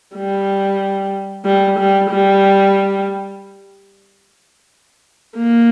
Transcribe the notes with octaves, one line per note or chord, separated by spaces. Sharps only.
G3
G3
G3
G3
A#3